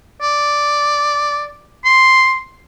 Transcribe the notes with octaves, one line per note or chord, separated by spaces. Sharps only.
D5
C6